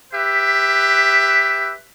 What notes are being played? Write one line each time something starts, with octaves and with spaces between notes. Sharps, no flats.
G4 B4 E5